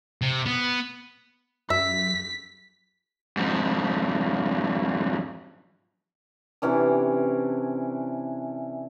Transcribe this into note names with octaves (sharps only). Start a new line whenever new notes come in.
C3
B3
F#2 E5 B6
F2 G#2
C3 E3 C#4 D4